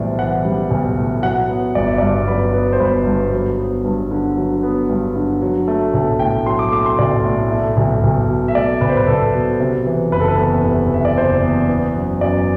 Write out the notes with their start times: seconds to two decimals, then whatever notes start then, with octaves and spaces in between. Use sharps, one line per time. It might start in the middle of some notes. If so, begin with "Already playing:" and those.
Already playing: B1 A2 E3 G3 C5 D5
0.19 E3 F#5
0.45 G3
0.71 B1
0.97 A2
1.23 F#3 F#5
1.49 B3
1.75 G1 D5
1.87 E5
1.98 G2 D5
2.27 F#3 B4
2.54 B3
2.73 C5
2.80 G1 B4
3.06 G2
3.33 F#3
3.58 B3
3.85 G2
4.11 D3
4.37 F#3
4.63 B3
4.90 G2
5.15 D3
5.42 F#3
5.68 A3
5.94 B1 A4
6.19 A2 G5
6.46 F#3 C6
6.59 D6
6.72 A3 D6
6.86 C6
6.99 B1 D5
7.25 A2
7.51 A3
7.77 B1
8.04 B1
8.29 B2
8.48 E5
8.55 A3 D5
8.81 B1 B4
8.89 C5
8.97 B4
9.07 B1 A4
9.34 B2
9.60 C3
9.86 E3
10.12 F#1 B4
10.20 A4
10.28 B4
10.38 E2
10.65 C3
10.91 E3 E5
11.05 D5
11.17 F#1 C5
11.42 E2
11.69 B3
11.95 F#2
12.21 F#2 D5